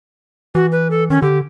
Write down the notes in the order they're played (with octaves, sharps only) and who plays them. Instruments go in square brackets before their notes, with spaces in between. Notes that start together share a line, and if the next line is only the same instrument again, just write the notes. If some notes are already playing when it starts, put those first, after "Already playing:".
[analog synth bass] E3 [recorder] F#4
[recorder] B4
A4
[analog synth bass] D#3 [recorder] C#4
[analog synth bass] D3 [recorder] G4